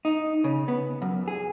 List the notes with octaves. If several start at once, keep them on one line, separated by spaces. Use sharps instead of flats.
D#4
C#3
B3
F#2
G#4